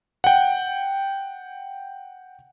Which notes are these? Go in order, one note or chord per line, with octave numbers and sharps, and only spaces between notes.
F#5 G5